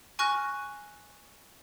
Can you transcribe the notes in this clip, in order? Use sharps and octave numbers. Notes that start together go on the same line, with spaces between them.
G#5 C#6 F6 F#6 A#6